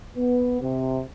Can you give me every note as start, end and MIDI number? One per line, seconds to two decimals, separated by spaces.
0.17 0.57 59
0.61 1.02 48